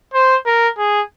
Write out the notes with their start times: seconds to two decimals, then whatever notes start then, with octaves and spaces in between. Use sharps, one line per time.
0.14 C5
0.46 A#4
0.78 G#4